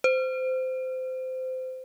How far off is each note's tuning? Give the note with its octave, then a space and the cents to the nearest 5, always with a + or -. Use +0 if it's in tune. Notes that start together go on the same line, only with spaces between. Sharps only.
C5 -20